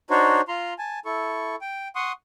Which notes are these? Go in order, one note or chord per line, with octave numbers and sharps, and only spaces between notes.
D4 D#4 F#4 C5 C#5
F4 A#5 C6
G#5 A5
E4 A4 C#6
G5
F#5 C6 C#6 D#6